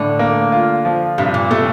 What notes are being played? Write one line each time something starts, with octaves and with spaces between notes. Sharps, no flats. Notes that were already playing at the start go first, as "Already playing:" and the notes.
Already playing: A2 D3
A#3
F4
F3
G2 C3
A#2
C3 A3